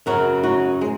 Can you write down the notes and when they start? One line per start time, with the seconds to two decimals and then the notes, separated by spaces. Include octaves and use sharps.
0.06 F#2 C#3 F#3 F#4 A#4
0.43 D#4 F#4
0.81 G#3